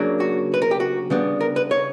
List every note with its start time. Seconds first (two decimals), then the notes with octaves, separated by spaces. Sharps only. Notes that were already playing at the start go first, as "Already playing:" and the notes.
Already playing: C#3 F#3 A#3 D4
0.20 F#4
0.54 B4
0.62 A#4
0.71 G4
0.80 F#4
1.10 C#3 G3 B3 D4
1.41 A#4
1.56 B4
1.71 C#5